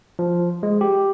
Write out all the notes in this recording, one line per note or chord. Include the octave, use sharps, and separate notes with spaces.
F3
G#3
G4